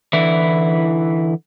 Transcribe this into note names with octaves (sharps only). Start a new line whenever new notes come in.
D3 E3 E4